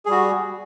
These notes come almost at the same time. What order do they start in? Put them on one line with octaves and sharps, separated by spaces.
G#4 G3 F#4